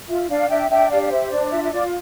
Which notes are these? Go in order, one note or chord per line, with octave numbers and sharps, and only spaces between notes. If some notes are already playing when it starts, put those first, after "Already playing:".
F4 E5
D4 D5 F5
D4 E5 G5
D4 E5 G5
G4 D5 F5
D5
C5 E5
D4 D5
D5
F4 E5
E5
F4 D5